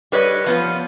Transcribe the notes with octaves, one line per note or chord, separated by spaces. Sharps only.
G3 B4 C#5 D#5
F3 B3 F4